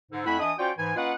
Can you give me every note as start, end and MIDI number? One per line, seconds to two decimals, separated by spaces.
0.12 0.25 44
0.12 0.25 50
0.26 0.37 41
0.26 0.37 57
0.26 0.37 64
0.26 0.37 78
0.26 0.37 80
0.26 0.37 83
0.40 0.52 52
0.40 0.52 62
0.40 0.52 75
0.40 0.52 76
0.40 0.52 87
0.58 0.70 61
0.58 0.70 65
0.58 0.70 66
0.58 0.70 72
0.58 0.70 74
0.58 0.70 79
0.78 0.93 44
0.78 0.93 52
0.78 0.93 80
0.96 1.13 58
0.96 1.13 61
0.96 1.13 65
0.96 1.13 71
0.96 1.13 75
0.96 1.13 78